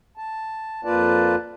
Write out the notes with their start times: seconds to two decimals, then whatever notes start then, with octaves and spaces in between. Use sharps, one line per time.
0.17 A5
0.84 F2 A#3 F4 B4 D5 A5